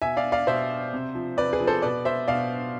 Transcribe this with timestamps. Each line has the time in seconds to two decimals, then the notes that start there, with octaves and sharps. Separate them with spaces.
0.02 B2 E5 G#5
0.17 D5 F5
0.32 D5 F5
0.47 B2 C5 E5
0.93 C3
1.15 F3
1.37 C3 B4 D5
1.53 G#4 B4
1.60 F3
1.67 A4 C5
1.82 B2 B4 D5
2.05 C5 E5
2.28 B2 D5 F5